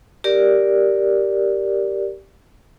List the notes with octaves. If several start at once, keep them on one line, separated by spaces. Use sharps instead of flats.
G4 A#4 D5